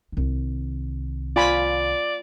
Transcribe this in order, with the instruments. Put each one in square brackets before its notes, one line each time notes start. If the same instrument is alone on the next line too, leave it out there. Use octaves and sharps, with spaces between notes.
[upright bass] C2 D#3
[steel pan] F4 G#5 B5 [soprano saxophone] D5